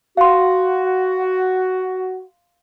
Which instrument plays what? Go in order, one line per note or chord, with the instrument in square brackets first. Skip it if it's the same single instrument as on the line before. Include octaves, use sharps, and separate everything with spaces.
[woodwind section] F#4 [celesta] F5 C6